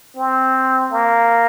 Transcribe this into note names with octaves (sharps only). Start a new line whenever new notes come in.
C4
A#3